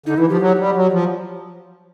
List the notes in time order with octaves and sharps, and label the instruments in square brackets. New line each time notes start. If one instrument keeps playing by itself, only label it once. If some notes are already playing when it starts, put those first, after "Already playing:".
[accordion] D3 [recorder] D#4
[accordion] E3 [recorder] E4
[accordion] F3 [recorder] G4
[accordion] F#3
G3
F#3
F3